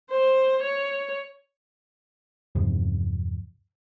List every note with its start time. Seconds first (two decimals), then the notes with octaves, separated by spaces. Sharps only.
0.10 C5
0.63 C#5
2.55 E2 G2 C3 F3